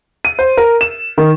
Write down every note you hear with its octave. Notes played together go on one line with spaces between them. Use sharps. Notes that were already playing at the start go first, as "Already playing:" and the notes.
D#7
C5
A#4
E7
D#3